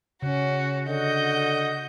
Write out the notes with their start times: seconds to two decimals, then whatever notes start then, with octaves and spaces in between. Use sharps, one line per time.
0.22 C#3 C#4 F#4
0.88 D3 F#4 D#5 G6